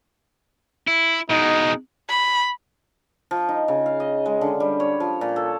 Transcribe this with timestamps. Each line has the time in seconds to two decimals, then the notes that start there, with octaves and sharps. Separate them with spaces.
0.88 E4
1.30 B2 G#3 D#4
2.09 B5
3.31 F3
3.49 D#4
3.68 C#3
3.86 F5
4.00 D#5
4.26 G#3
4.41 D3
4.60 G3
4.80 C#5
5.00 F3
5.21 A#2
5.36 A4